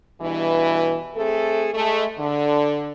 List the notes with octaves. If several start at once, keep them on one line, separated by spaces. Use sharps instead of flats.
G2 B2 E3
A3 C4 G#4 A4
G#3 A3
D3